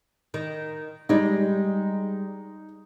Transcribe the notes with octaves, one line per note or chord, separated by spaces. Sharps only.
D#3
G3 G#3 D#4